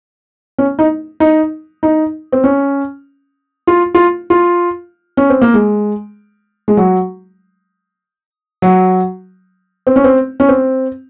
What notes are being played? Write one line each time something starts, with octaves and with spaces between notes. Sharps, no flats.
C#4
D#4
D#4
D#4
C4
C#4
F4
F4
F4
C#4
C4
A#3
G#3
G#3
F#3
F#3
C4
C#4
C4
C#4
C4